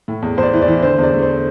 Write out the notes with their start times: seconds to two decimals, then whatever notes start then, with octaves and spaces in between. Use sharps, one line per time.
0.08 A2
0.22 E2
0.37 E2 C5
0.43 D5
0.53 E3
0.62 D5
0.68 E3
0.83 D3 C5
0.98 E2
1.03 D5
1.13 A3
1.22 C5